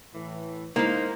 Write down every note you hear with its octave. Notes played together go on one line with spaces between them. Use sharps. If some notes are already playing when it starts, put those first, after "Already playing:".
A2 E3
G#3 A#3 D#4 E4 A#4 C5 F5